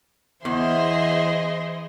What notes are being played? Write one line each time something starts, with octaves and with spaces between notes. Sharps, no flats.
E2 E3 G#4 C5 D#5 E5 C6